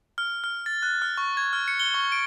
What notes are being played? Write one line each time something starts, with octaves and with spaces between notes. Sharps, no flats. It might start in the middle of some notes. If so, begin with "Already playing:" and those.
F6
F6
A6
F#6
F6
C#6
G#6
F6
C#7
G7
C#6
D7